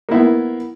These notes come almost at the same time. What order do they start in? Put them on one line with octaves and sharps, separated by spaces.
A#3 E4 B3